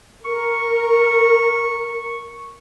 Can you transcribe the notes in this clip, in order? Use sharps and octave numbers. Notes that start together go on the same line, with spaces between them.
A#4 C#6